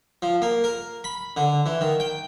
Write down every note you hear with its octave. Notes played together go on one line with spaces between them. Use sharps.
F3
A#3
A#4
B5
D3
E3
D#3
G5